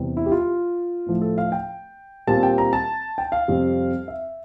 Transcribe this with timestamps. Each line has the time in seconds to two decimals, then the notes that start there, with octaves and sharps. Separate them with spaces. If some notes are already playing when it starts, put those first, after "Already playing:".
Already playing: E2 C3 G3
0.17 E4
0.26 G4
0.32 F4
1.06 A2 F3 A3
1.22 A4
1.38 F5
1.52 G5
2.27 A#2 G3 C4 A5
2.43 G5
2.58 A#5
2.73 A5
3.18 G5
3.32 F5
3.48 F2 C3 G3 C4
4.08 E5